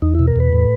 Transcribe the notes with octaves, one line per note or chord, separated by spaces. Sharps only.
E2 D#4
B2 E4
A#4
E2 B4
A2